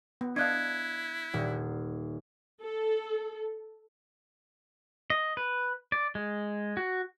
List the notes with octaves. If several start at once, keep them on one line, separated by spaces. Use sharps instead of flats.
B3
D4 E4 D#5 F5 F#6 G#6
D#1
A4
D#5
B4
D5
G#3
F#4